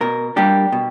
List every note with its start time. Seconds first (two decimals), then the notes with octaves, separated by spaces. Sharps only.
0.01 B2 A#4
0.36 G3 A#3 D4 G4
0.72 B2